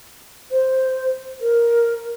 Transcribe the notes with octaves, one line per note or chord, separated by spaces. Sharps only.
C5
A#4